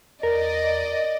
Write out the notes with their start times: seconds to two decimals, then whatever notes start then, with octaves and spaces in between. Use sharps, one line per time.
0.23 E2 A#4 D5 D#5